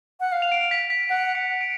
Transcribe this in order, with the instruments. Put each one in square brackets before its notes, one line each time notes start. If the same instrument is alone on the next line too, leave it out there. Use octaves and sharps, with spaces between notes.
[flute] F#5
F5
[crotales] F7
D7
B6
B6
[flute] F#5 [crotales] D7
[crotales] C#7
D7